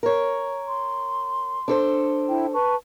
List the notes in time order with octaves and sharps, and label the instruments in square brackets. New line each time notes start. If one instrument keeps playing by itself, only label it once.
[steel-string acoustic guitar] A#4 C#5
[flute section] C6
[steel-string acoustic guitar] D4 A4 C5
[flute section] E4 G5
B4 A5 C#6